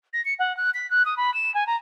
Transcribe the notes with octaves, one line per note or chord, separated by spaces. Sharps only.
A#6
C#7
F#5
F#6
B6
F#6
D#6
B5
E7
G#5
A#5